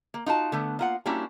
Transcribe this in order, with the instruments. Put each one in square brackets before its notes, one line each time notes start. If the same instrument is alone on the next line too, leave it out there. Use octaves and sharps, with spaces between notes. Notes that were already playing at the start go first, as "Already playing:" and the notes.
[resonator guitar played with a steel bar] A#3
D#4 F4 F#4 A5
D3 A3 B3
A#3 F4 F#5
G3 A#3 C#4 D4 E4 F#4